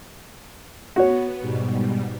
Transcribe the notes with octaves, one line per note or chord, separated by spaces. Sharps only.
B3 F#4 C#5
G#2 B2 G3